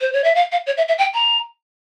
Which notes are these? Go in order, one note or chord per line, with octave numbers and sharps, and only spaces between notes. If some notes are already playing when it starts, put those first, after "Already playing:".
C5
C#5
E5
F5
F5
C#5
E5
E5
G5
A#5